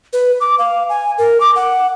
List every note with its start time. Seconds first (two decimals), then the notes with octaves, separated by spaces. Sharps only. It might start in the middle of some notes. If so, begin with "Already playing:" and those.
0.13 B4
0.41 D6
0.59 F5
0.89 G#5
1.18 A#4
1.41 D6
1.56 F#5